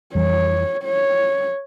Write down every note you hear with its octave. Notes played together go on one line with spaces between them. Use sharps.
F2 E3 G3 C#5
C#5